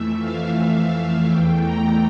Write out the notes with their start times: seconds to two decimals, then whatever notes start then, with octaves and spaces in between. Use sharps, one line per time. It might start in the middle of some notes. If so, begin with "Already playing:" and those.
Already playing: F2 E3 A3 E5
0.19 F5
1.27 E2 E3 A3 G5
1.64 A#5